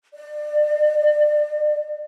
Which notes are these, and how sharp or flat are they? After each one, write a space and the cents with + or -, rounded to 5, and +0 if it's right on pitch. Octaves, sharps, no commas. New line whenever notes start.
D5 +30